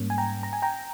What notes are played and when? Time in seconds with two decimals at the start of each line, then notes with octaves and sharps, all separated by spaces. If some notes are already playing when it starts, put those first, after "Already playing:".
Already playing: G#2 G3 A#3 C#4
0.10 G#5
0.18 G5 A#5
0.43 A#5
0.53 G#5
0.62 G5 A#5